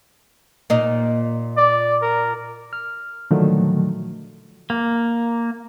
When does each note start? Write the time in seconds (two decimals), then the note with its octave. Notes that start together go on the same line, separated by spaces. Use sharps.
0.70 A#2 D#4
1.58 D5
2.02 A#4
2.73 F6
3.31 A#2 D3 D#3 F3 F#3 A3
4.70 A#3